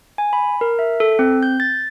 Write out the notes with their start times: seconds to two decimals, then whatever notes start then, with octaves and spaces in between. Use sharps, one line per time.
0.18 G#5
0.33 B5
0.61 A#4
0.79 E5
1.00 A4
1.19 C4
1.43 G6
1.60 A6